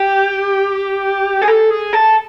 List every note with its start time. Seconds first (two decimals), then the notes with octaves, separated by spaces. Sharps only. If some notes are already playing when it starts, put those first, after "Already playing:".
Already playing: G4
1.42 G#4
1.48 A4
1.70 G#4
1.93 A4